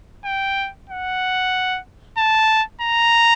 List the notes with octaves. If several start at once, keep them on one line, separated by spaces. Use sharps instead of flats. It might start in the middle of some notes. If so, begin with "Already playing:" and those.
G5
F#5
A5
A#5